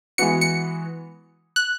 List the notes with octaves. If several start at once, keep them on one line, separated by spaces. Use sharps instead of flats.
E3 G#3 B3 F#4 C#7
C#7
F#6